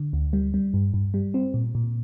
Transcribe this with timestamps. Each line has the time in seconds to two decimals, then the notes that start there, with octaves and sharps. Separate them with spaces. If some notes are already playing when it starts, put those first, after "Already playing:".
Already playing: D3
0.13 D2
0.33 G3
0.54 G3
0.74 G2
0.94 G2
1.14 G3
1.34 C4
1.54 A#2
1.75 A#2